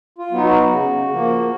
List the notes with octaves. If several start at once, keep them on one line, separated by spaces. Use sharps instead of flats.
F4
F#3 B3 D#4
F#4
C#3
F3 A#3